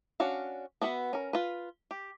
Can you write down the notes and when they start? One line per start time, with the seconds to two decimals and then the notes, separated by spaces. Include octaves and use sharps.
0.20 C#4 D4 F#4 F5
0.82 B3 D4 F#4 B4 E5
1.13 C#4 A#4
1.33 F4 B4
1.91 G4